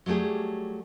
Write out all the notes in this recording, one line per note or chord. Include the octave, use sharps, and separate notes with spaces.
F#3 G3 A3 G4 G#4